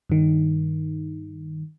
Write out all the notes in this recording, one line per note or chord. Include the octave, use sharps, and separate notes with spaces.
G2 D#3